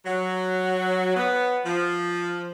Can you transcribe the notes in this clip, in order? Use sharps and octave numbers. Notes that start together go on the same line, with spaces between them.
F#3
B3
F3